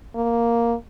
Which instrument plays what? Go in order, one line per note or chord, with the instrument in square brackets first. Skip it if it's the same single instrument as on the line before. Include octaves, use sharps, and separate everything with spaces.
[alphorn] A#3